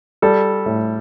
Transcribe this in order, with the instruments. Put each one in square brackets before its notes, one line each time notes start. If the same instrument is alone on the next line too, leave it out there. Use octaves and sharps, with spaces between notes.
[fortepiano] G3 A4
A2